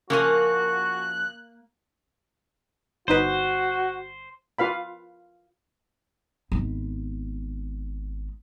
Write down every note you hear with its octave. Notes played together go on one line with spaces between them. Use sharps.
C#3 F3 A#3 F#4 G#5 F#6
G1 D#4 F#4 B4 C5
F4 B4 F5 B5
G#1 B3